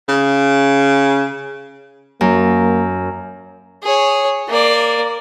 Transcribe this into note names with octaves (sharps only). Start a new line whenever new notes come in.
C#3
F#2 A#3
G#4 C#5
A#3 D5